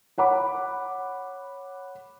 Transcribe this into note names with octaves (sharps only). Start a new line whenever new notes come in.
C#5 F#5 B5 D6